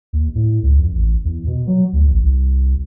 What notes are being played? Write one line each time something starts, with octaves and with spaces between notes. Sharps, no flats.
D#2
A2
C#2
F2
A1
E2
B2
F#3
D2
A1
C2